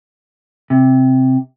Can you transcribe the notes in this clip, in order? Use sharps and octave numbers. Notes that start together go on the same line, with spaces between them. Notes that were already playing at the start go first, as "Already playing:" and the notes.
C3